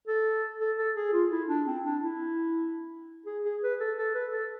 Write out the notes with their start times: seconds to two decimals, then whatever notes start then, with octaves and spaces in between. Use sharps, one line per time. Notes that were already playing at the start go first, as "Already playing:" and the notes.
0.07 A4
0.60 A4
0.78 A4
0.96 G#4
1.13 F4
1.31 E4
1.49 D4
1.66 C4
1.85 D4
2.02 E4
3.26 G#4
3.45 G#4
3.63 B4
3.80 A4
3.97 A4
4.15 B4
4.33 A4